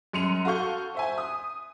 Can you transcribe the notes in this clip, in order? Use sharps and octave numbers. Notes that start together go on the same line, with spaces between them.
F#2 C6 C#7 D#7 F7
F#4 A4 F5 C#6 G6
C5 E5 G#5
D#6